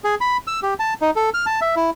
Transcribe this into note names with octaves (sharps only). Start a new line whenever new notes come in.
G#4
B5
E6
G4
A5
D#4
A4
F6
A5
E5
E4